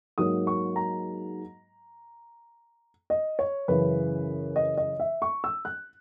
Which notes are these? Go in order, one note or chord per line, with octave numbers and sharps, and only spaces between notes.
G#2 F#3 A#3 D#6
C#6
A#5
D#5
C#5
F#2 C#3 E3 B4
D#5
D#5
E5
C#6
E6
F#6